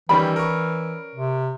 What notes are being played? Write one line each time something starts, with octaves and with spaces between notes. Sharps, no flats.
D#3 E3 G3 C#4 D5 B5
A#4 C#6
C3